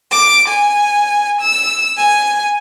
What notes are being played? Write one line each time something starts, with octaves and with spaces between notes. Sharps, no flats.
D6
G#5
E6
G#5